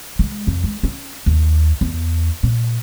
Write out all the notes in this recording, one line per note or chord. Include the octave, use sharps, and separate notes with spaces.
G#3
F2
G#3
C#4
D#2
E2
A#2